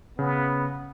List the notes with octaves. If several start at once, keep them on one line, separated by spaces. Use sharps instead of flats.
C#3 B3